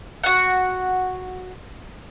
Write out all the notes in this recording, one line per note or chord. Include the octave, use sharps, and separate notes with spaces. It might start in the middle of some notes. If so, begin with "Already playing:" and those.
F#4 F#5